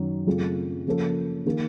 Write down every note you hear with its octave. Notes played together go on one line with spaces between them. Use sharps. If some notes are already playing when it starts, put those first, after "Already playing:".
Already playing: F#2 D#3 F#3
F#2 C#3 A3 C4 F4
C#3 F3 A#3 C#4 A4
D#3 A#3